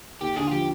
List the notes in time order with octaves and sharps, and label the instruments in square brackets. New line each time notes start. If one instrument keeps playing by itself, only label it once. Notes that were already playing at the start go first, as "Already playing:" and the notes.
[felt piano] D#2 [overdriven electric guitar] G4
[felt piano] D3 [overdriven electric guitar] G#4
[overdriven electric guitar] F4
[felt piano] F3 [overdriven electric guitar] G4